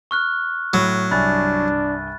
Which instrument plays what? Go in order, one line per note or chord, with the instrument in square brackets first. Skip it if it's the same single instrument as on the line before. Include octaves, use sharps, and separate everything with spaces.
[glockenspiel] C#6 F6 F#6
[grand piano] A2 [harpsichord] F#3
[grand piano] C2 G2 G#5 [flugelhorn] D4 [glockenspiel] B5 F#6 A6